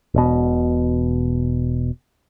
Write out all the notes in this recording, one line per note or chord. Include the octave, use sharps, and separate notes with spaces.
E1 B2